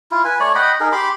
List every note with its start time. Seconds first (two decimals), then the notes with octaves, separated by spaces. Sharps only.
0.11 E4 F4
0.25 B4 G#5
0.40 A3 C#5 D5
0.55 D#5 F#5 G5 B5
0.80 D#4 G#4 A#4
0.92 G4 B5 C6 D6